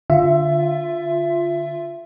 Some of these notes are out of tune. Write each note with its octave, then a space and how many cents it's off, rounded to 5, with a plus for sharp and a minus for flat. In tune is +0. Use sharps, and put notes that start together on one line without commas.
D3 +0 F4 +0 E5 +20